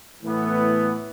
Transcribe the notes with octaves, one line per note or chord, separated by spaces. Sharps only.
A2 E3 B3